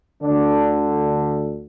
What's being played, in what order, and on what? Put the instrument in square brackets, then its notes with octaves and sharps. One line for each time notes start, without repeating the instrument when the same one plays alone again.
[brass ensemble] D2 D3 D4